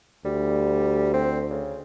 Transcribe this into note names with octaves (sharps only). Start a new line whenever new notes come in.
D2 G3
C4
C#3